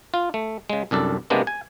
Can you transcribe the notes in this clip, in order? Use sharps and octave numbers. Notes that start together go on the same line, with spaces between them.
F4
A3
C#3 G#3
C2 F#2 D4 A4
C3 G#3 A#3 B3 D4
G#5